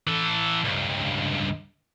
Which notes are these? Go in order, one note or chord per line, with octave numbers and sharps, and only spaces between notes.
E3 A4
C#2 G2